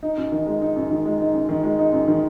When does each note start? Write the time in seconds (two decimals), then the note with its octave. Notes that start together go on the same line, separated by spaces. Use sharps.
0.03 D#4
0.17 F#2
0.32 D#3
0.46 G#3
0.62 D#4
0.76 F#2
0.91 D#3
1.06 G#3
1.20 D#4
1.35 F#2
1.49 D#3
1.63 G#3
1.79 D#4
1.93 F#2
2.08 D#3